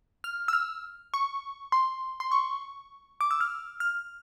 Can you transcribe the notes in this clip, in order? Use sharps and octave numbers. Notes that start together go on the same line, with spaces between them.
F6
E6
F6
C#6
C6
C6
C#6
D6
E6
F6
F6